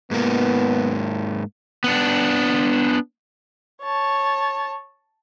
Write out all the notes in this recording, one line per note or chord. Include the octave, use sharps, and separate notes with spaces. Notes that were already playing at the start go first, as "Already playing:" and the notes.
G#2 A#3 B3
B3 D4
C#5 A5